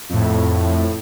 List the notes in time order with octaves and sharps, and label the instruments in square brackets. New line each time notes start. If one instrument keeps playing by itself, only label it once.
[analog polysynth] F2 A2